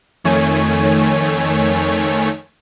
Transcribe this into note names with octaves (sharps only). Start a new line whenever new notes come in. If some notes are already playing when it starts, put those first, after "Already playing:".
F2 D#3 A3 C#5 G#5